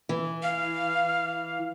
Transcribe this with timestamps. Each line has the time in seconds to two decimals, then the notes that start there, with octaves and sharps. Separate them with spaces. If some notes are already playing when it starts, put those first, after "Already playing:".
0.09 E3
0.43 F5